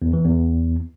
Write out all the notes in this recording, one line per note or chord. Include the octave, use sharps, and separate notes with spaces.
E2
E3
E2